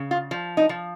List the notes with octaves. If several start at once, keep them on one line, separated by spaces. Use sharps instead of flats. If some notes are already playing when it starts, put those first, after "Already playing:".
Already playing: C#3
F4
F3
D#4
F3